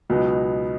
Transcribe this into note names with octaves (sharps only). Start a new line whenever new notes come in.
C#2 B2 F#3 B3 D#4